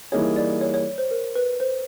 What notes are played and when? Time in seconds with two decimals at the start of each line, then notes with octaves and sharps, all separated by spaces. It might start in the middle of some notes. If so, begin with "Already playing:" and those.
0.12 E3 G3 A#3 D#4 G#4 C#5
0.36 D5
0.61 C#5
0.74 C#5
0.98 C5
1.11 A#4
1.35 B4
1.60 C5